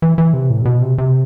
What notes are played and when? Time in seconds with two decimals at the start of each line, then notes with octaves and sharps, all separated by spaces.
0.02 E3
0.18 E3
0.34 C3
0.50 A2
0.62 C3
0.65 B2
0.82 C3
0.98 C3